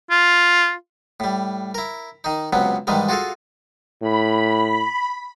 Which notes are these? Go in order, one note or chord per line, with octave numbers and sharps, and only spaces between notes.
F4
A2 G3
E4 A#4
D#3 D#4
C#2 C3 F#3 B3
G#2 D#3 E3 G3 G#3
F4 F#4 G#4 A4 F5
A2 B5